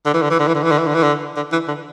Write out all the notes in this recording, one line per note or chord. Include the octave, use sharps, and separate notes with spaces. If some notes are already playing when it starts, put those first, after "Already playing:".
D3
E3
D3
E3
D3
E3
D3
E3
D3
E3
D3
E3
D3
D3
E3
D3